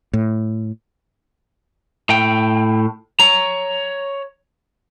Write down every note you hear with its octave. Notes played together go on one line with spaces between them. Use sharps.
A2
A2 G5
C#5 A#5